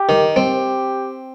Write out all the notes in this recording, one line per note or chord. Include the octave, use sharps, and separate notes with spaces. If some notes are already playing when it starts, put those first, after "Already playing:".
Already playing: G4
D#3
C4 G4